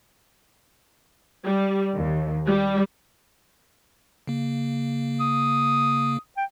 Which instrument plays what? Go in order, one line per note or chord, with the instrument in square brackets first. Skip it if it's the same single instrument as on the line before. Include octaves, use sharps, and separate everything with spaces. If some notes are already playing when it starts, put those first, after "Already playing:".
[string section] G3
D#2
G3
[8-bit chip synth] C#3 A#3
[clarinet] D#6
G5